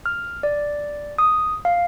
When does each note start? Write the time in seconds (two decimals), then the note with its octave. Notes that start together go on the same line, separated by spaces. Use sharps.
0.06 F6
0.43 D5
1.19 D#6
1.65 F5